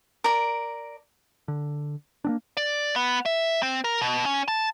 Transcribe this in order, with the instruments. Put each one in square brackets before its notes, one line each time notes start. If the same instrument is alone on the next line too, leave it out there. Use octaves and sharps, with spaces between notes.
[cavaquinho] A#4 D5
[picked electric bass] D3
A#3 C4 D4
[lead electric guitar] D5
B3
E5
C4
A#4
B2
C#4
A5